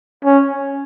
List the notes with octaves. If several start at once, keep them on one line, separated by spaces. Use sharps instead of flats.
C#4